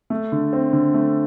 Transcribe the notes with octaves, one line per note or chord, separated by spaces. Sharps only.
A3
D3
C4
D3
A3